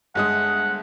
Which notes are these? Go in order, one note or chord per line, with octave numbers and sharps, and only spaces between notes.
G1 G#3 F#5 D#6